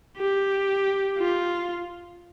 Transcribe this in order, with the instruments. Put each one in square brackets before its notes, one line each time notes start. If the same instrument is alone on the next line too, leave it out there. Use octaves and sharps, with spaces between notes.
[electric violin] G4
F4